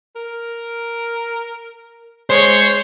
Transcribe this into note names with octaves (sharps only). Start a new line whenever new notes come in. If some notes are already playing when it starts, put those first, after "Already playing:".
A#4
G#3 C5 C#5